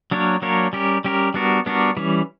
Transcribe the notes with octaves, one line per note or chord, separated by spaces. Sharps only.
F#3 A#3 D4 A#4 C#5
F#3 A#3 D4 A#4 C#5
G3 C#4 G4 A#4
G3 C#4 G4 A#4
G3 B3 D4 F#4 A#4
G3 B3 D4 F#4 A#4
E3 G3 C#4